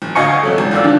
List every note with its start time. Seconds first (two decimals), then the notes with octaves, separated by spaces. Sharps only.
0.02 F#1
0.15 D2 D#5 F5 G#5 C#6 C#7
0.43 C3 F#3 A3
0.58 G#1
0.71 F#1 F4 D5 E6
0.84 G2 D3 D#3